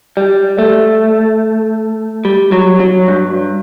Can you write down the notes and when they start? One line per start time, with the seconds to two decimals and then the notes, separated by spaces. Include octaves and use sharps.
0.17 G3
0.59 A3
2.25 G3
2.52 F#3
2.80 F#3
3.08 G2